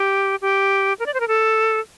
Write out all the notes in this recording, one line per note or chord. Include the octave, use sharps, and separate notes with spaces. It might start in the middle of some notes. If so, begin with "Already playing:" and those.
Already playing: G4
G4
A#4
D5
C5
A#4
A4